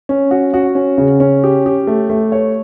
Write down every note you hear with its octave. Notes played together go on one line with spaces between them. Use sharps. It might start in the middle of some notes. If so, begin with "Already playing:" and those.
C#4
F#4
F#4
C#4
C#3
C#4
G4
G4
A3
A3
C#5